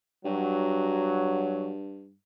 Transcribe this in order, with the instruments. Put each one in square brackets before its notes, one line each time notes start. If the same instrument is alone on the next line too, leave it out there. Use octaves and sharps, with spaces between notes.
[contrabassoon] G2 [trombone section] F#3